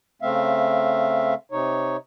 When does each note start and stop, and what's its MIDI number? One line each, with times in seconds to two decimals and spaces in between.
0.22 1.34 49
0.22 1.34 57
0.22 1.34 60
0.22 1.34 76
0.22 1.34 77
1.51 1.97 48
1.51 1.97 63
1.51 1.97 73